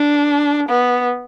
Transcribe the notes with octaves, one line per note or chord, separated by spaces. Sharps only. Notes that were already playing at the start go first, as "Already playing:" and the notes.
Already playing: D4
B3